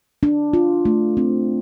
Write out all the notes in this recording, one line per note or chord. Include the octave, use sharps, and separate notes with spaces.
D4
F4
A3
C4